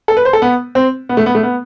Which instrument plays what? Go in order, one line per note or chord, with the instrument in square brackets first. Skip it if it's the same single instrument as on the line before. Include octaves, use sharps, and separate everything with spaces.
[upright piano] A4
B4
C5
A4
B3
C4
B3
A3
B3
A3
B3